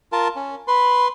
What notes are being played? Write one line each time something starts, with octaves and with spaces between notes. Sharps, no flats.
F4 A#4 A5
C#4
B4 B5 C6